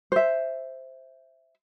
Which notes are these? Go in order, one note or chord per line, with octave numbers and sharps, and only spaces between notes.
C5 E5